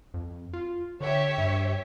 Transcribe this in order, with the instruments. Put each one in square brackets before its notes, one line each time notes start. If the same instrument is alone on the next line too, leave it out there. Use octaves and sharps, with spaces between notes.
[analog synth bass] F2
F4
[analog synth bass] D3 [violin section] G4 C#5 E5
[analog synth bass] G2